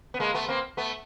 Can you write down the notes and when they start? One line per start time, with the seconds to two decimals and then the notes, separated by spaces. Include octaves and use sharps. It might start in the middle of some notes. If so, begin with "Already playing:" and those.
0.14 B3
0.20 G#3 A#3
0.34 A3 B3
0.48 A#3 C4
0.77 A3 B3